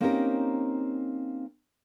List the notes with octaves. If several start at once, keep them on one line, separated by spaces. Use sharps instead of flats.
A#3 C4 C#4 D#4 G4 A#4